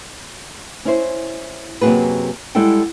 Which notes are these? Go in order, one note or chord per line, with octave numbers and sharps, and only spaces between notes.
C#4 E4 C5
F#2 C3 A#3 F#4 G#4 B4
G3 G#3 E4 A4 F#5 G5